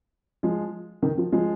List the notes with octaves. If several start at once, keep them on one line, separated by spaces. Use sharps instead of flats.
F3 G#3
D#3
F3
F3 G#3